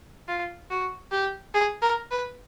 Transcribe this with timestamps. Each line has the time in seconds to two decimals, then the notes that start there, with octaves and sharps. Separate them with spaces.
0.28 F4
0.70 F#4
1.12 G4
1.54 G#4
1.82 A#4
2.11 B4